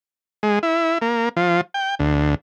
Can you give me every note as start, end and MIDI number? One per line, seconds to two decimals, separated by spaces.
0.43 0.59 56
0.63 0.98 64
1.02 1.29 58
1.37 1.61 53
1.74 1.95 79
1.99 2.35 38